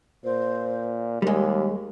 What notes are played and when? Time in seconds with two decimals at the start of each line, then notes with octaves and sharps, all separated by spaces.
0.25 A#2 C5
1.22 D#2 G3 G#3 G#4